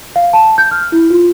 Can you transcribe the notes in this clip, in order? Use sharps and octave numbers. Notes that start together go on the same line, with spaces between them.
F5
A5
G6
F6
E4
F4